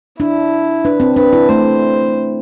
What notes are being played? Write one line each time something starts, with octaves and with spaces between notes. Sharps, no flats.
D4 E4
D4 B4
C4
D4 B4
E4
A3 C5